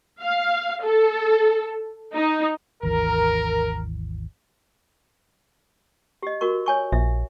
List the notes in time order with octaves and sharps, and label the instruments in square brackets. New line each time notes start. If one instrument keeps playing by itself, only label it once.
[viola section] F5
A4
D#4
[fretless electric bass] G#1 D#2 E3 [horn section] A#4
[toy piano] G4 D#5
F#4 A#4 C#6
C#5 G#5 C#6
[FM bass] A#1 [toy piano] E5